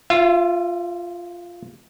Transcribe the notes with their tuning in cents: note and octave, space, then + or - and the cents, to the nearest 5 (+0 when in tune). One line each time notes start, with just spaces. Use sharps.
F4 +0 E5 +35